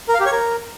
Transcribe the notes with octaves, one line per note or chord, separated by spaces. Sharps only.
A#4
F5
G4
C#5
A#4